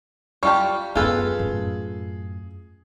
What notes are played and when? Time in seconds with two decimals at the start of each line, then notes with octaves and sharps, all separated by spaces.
0.43 G3 F4 G4 A5 C#6
0.95 F#2 B3 F4 G#4 A4 B4
1.39 F#2 A2